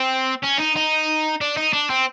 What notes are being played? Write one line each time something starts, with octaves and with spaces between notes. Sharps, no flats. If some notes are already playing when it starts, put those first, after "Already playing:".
Already playing: C4
C#4
D#4
D#4
D4
D#4
D4
C4